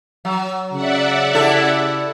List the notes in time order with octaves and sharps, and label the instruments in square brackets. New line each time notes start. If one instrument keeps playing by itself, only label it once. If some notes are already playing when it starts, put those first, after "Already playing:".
[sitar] F#3
[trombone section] C#3 [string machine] D5 E5 F#5
[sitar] E4 G4 A4